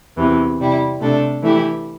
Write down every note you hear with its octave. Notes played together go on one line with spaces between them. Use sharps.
E2 C3 E3
C3 G3 E4
C3 A3 D4 A4
E3 A3 E4 G4